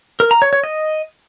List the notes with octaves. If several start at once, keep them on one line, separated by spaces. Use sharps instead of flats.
A#4
A#5
C#5
C#5
D#5